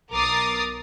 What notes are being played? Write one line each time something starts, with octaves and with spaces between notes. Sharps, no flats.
B1 A#4 D6 D#6 A6 C7